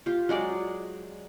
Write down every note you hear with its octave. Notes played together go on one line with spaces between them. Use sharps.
F4 G4
F#3 G#3 G#4 D5